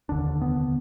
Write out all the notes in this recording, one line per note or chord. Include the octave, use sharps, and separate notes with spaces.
F1 D#2 D3 D4
B3